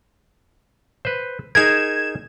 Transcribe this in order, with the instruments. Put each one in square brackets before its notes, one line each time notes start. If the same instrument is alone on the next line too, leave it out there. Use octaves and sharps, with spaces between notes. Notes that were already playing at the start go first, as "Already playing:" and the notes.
[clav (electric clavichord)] B4 C5
[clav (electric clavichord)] D#4 G#4 A#4 [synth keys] G#6 E7